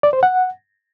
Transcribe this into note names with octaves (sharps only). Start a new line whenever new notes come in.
D5
C5
F#5